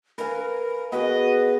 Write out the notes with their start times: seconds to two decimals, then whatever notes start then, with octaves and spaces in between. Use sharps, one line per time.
0.18 A#4 B4 F5 G#5
0.92 B3 F#4 G#4 B4 D#5